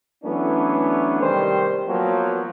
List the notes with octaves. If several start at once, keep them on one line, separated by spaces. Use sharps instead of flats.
E3 F#3 A3 B3 C#4 D4
C3 D#3 G3 G4 C5
F3 F#3 A#3 B3 F#4